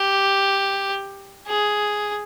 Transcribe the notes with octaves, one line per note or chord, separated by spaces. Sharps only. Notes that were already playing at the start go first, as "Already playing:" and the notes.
Already playing: G4
G#4